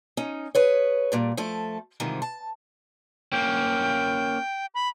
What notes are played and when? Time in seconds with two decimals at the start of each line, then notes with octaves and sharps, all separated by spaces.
0.17 C#4 D#4
0.55 G#4 B4 C#5
1.12 G2 A#2 G3
1.37 F3 A3 A4
2.00 G#2 C3 D#3 E3 G3 F4
2.22 A5
3.32 A#3 C#4 G5
4.75 B5